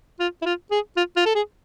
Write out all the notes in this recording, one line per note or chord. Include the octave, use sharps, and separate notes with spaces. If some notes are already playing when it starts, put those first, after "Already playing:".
F4
E4
F4
G#4
F4
F4
A4
G#4